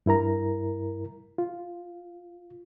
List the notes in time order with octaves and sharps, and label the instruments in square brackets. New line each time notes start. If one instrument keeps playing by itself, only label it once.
[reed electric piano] G2 E4 A#4 A#5
F4